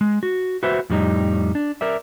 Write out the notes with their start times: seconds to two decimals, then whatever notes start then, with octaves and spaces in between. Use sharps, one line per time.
0.01 G#3
0.23 F#4
0.63 F#4 B4 C5 E5
0.90 F2 A2 G3 D#4
1.55 D4
1.81 A#4 D5 E5